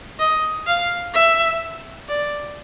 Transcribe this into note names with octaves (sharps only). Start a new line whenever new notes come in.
D#5
F5
E5
D5